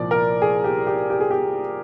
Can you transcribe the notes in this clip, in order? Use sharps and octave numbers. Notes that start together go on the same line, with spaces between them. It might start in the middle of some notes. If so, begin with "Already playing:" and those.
Already playing: C2 A#2 F3 D5
A#4
G#4
G4
G4
G4
G#4
G4